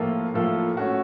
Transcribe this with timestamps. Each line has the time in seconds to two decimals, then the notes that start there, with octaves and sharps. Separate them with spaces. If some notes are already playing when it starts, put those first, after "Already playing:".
Already playing: A2 F3 A#3 F4 A4
0.34 A2 F3 A#3 F4 A4
0.77 A3 C#4 F#4